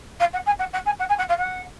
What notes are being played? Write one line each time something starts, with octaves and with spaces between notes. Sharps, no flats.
F5
F#5
G#5
F#5
F#5
G#5
F#5
G#5
F#5
F5
F#5